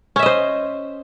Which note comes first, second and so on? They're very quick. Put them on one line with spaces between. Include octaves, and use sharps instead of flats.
C#4 E5 D#5 C5